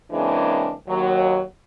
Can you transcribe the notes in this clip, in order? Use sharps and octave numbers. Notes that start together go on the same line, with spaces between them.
C#3 E3 G#3 A#3 C4 D4
D#2 F#3